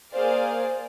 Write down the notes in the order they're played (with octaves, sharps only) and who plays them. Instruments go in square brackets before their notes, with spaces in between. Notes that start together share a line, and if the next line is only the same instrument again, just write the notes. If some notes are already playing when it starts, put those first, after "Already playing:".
[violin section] A#3 G#4 C5 D5 F5